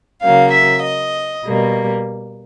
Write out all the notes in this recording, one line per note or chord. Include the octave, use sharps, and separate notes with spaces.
C#3 F#3 A#3 F5
E5
D#5
B2 G3 A#3